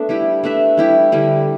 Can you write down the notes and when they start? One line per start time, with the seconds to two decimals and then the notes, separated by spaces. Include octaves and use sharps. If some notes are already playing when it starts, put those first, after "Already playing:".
Already playing: A3 B3 D4 A4 E5
0.09 G3 E4 G4
0.44 A3 D4 B4 E5
0.77 G3 E4 G4
1.12 D3 G3 E4